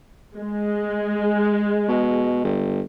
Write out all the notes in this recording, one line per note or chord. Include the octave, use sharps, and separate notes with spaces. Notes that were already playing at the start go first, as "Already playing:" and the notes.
G#3
B2
G1